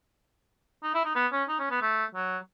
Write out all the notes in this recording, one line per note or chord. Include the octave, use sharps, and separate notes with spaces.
D#4
E4
D#4
B3
C#4
D#4
C#4
B3
A3
F#3